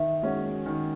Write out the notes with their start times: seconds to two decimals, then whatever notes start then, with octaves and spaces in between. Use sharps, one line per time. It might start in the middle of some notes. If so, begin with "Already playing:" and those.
Already playing: D#3 E5
0.23 G#3 C#4 F#4
0.66 D#3